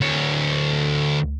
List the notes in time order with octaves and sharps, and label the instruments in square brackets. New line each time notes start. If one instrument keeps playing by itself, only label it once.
[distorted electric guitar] D2 C#5